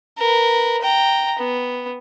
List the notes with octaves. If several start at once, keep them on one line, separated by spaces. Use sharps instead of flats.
A#4 B4
G5 A#5
B3